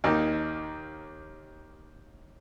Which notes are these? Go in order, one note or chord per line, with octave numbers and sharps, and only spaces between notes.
D#2 A#3 D#4